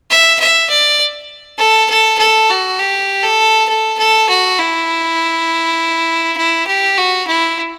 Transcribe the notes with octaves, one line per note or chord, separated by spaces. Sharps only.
E5
E5
D5
A4
A4
A4
F#4
G4
A4
A4
A4
F#4
E4
E4
G4
F#4
E4